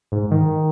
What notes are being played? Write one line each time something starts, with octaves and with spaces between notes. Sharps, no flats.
G#2
D#3